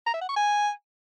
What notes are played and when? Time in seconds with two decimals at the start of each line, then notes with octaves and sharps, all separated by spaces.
0.06 A#5
0.14 E5
0.21 F#5
0.29 C#6
0.36 G#5